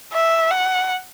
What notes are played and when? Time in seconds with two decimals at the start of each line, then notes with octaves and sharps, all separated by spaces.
0.13 E5
0.51 F#5